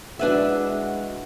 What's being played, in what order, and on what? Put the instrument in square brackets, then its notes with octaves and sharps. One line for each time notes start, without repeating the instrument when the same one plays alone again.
[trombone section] G#3 E4 F#4 [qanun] D4 B4 E5